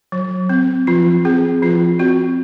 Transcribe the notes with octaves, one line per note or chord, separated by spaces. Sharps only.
F#3
C4
F3 F4
C4 G#4
F3 F4
C4 F#4